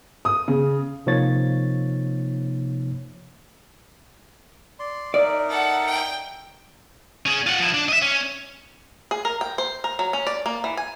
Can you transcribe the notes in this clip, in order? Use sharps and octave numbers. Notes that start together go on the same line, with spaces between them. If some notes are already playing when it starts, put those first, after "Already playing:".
D#6
C#3
C3 F3 A#3 D#4 C#5 A6
D5 C6
D#4 A#4 D5 E5
A4 F#5
G5
C#4 G#4
F4 F#5
F3 E4
D4
D#5 E5
C#4
G#4
A#4
G5
C5
A#4
F#3
C#4
D5
A#3
E3
G#5